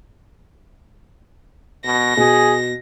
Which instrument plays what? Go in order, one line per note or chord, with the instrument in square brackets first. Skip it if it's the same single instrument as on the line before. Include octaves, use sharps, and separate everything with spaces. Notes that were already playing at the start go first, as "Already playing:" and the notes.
[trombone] B2 [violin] A#6
[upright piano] B2 [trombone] G#4